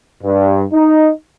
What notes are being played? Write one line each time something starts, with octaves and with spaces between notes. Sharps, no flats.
G2
D#4